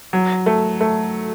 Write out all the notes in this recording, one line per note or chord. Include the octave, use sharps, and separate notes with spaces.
F#3
A3
A3